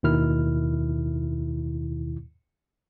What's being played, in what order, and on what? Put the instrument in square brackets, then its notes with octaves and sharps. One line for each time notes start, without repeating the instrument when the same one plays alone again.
[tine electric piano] D#2 B2 D#3 E4 F6